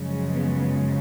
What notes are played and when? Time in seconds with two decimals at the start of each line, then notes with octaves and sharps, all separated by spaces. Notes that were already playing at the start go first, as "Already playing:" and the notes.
Already playing: F#2 C#3 F3 G#3
0.32 B3